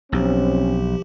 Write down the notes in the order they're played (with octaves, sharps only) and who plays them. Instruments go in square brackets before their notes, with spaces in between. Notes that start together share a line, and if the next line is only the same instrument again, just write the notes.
[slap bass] B1 [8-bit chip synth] F3 G4 [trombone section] C4 C#4